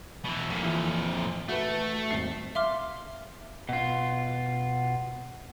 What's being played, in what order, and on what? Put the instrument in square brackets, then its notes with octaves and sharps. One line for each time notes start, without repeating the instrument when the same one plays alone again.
[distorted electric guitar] B2 E3
[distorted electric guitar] F2 A#2 [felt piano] D#7
[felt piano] E3 F4
[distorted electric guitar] A3 [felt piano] F#4 B4
[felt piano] D#1 G#1 C7
[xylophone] E5 F5 C6 D6 F6
[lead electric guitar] B2 F4